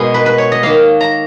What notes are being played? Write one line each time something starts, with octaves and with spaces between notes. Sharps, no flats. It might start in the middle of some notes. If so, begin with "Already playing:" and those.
Already playing: B2 G#3 B3
B4
B4
C#5
D#5
D#3 A#3 F5
A#5